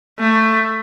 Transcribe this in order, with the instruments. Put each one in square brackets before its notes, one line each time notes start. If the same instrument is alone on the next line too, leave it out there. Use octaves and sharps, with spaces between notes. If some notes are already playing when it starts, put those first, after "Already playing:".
[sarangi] A3